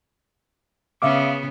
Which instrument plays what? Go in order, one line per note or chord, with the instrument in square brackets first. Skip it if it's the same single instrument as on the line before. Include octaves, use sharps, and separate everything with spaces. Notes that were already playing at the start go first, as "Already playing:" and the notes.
[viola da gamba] C#3 B3 [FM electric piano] E5 F5 D6